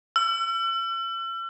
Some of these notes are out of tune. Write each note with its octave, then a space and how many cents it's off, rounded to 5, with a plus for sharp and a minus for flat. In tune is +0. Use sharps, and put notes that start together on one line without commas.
E6 +45